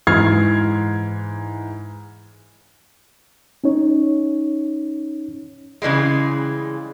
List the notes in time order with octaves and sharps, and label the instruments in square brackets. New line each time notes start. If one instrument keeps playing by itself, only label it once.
[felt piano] G#2 E3 F6 G#6 C7
[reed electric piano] C#4 D#4 C#5
[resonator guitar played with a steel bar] C#3 E3 G3 G#3